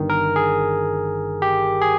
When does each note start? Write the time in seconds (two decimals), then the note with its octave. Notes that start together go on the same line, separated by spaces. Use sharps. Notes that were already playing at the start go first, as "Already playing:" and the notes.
Already playing: G1 G2 D#3
0.10 A#4
0.36 G#4
1.42 G4
1.81 G#4